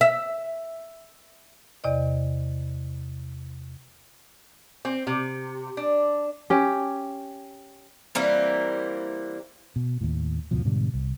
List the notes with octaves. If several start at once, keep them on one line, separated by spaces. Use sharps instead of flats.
E5
E2 C3 D5 D#5
C4
C3
D4
C#4 G4
E3 G3 A#3 C4
B2
D#2 A2
D2 G#2 B2 F3
G#2 B2 D3 G3
C2